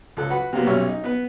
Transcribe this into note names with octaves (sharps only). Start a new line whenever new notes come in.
C#2 A4 F#6
F#4 B4 F#5 B5
C3 F#3 A#3 B3
B1 F#3 G3 C#4 E5 F6
D#4
B3 B4